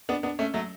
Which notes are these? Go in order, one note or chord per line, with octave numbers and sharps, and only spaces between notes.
B3 D4
B3 D4
A3 C#4
F#3 A3